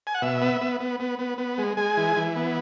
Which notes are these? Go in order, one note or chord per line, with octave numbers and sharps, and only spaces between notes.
G#5
F#5
B2 E5
B3
B3
B3
B3
B3
B3
G#3
G#3 G#5
E3
E3
B3